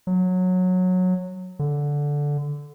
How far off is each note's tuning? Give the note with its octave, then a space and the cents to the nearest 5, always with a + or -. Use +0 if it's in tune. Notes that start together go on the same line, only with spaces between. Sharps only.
F#3 -15
D3 -10